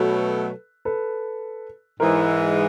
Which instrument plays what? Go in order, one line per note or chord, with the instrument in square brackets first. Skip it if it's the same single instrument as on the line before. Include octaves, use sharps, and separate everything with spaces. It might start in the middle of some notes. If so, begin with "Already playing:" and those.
Already playing: [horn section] B2 F#3 A3 [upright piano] A4 B4
[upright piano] A4 B4
[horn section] G#2 E3 G#3 [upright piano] A#4 C5